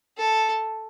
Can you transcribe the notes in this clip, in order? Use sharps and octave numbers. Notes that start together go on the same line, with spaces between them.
A4